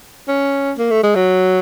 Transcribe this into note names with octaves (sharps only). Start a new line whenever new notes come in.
C#4
A#3
A3
G#3
F#3